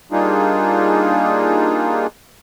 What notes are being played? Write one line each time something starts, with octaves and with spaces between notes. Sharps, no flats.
G3 A#3 D4 D#4 F4 G#4